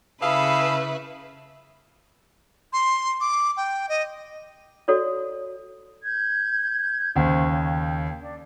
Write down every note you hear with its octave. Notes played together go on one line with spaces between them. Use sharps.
C#3 E4 G#4 A4 B4 F5
C6
D6
G5
D#5
F#4 A4 C#5 D5
G6 G#6
D#2 C#3 C5 C#6
C#5 G5
D4